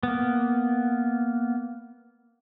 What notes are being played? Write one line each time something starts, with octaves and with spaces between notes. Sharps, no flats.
A#3 B3